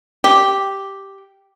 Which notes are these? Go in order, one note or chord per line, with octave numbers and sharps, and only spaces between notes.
G4